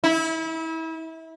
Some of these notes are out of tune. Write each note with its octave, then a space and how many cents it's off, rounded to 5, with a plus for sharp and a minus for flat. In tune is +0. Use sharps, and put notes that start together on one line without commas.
E4 -30